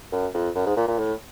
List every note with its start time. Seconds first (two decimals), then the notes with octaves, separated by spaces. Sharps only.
0.12 F#2
0.34 F2
0.55 F#2
0.66 G#2
0.76 A#2
0.88 A#2
0.99 A2